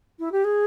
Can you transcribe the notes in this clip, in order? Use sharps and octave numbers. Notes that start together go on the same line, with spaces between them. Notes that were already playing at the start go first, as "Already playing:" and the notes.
E4
G4
G#4